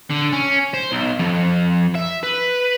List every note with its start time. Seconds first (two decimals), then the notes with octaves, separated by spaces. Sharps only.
0.10 D3
0.32 C#4
0.74 C5
0.92 B1
1.19 F2
1.95 E5
2.23 B4